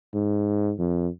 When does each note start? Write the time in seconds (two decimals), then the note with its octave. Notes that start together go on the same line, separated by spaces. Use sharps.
0.14 G#2
0.79 F2